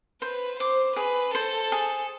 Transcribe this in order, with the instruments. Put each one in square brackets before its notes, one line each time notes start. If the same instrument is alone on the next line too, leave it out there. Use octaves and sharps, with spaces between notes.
[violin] B4 [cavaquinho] C5
[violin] C5 [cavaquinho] D6
[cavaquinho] G#4 [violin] B4
[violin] A4 [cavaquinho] C5
[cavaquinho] G#4